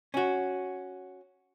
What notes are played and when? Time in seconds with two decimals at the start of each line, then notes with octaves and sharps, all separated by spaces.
0.14 C#4 F#4